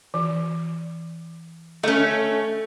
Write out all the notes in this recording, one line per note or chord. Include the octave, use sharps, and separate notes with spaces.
E3
A3 C#4 A4 D#5